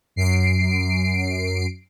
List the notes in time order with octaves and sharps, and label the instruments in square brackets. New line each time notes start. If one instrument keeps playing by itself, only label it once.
[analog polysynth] F#2 C7 D7